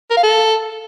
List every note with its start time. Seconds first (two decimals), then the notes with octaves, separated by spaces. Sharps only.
0.11 A#4
0.17 F5
0.23 A4